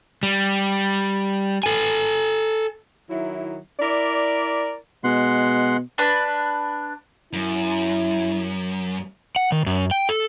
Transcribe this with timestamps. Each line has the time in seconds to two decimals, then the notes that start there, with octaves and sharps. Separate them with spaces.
0.23 G3
1.63 A4 G#5
3.10 D#3 F#3 E4
3.80 E4 A#4 D5
5.04 B2 G#3 F#5 C6
5.98 D4 B4
7.33 F#2 E4
9.36 F#5
9.52 D#3
9.66 F#2
9.91 G5
10.09 A4